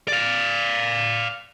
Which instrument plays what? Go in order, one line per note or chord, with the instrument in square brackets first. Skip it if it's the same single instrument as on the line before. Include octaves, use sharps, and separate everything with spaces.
[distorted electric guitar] D5 F5